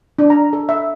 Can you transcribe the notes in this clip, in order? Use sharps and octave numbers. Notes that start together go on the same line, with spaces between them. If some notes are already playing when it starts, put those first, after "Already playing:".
D4
A#5
A4
E5